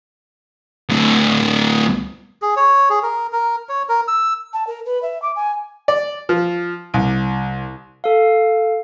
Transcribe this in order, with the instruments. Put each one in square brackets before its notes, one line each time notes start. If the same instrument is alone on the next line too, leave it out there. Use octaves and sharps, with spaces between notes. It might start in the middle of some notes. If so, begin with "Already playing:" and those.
[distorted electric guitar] D2 A2
[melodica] G#4
C#5
G#4
A#4
A#4
C#5
A#4
E6
[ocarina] A5
A#4
B4
E5
D6
G#5
[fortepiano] D5
F3
C2
[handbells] A4 F5